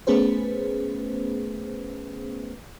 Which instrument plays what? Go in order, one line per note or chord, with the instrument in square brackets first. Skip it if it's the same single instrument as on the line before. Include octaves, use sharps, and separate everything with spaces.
[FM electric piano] A3 B3 C#4 G#4 B4 C5